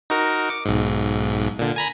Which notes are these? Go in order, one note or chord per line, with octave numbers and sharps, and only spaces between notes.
D#4 F#4 A#4
D6 C#7
B1 G#2
A#2 D3
G#5 A#5 B5